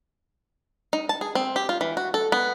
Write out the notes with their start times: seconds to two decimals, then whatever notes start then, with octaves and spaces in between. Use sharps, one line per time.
0.93 D#4
1.09 A5
1.21 G#4
1.35 C4
1.56 G4
1.69 F4
1.81 E3
1.97 F#4
2.14 A4
2.32 B3